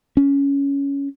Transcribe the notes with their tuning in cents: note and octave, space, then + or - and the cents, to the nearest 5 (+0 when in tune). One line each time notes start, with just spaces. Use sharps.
C#4 +10